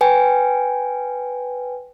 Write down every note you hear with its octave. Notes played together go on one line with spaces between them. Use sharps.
B4 G5 G#5